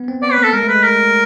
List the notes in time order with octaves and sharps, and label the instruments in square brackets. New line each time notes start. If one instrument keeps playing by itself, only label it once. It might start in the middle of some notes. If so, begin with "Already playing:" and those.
Already playing: [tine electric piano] B3
C4
[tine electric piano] B3 [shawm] D5
[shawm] B4
[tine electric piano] A#3
[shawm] A4
[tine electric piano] G#3 [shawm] A#4
[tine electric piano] A3
[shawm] B4
[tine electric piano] G#3
[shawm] A#4